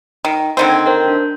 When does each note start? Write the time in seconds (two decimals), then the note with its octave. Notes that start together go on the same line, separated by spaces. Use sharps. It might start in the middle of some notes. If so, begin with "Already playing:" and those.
0.25 D#3
0.57 D3 D#3 C4
0.70 G#6
0.86 A#4 C5
1.08 D4